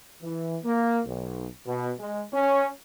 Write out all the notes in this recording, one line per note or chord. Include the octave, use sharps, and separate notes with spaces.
E3
A#3
B1
B2
G#3
C#4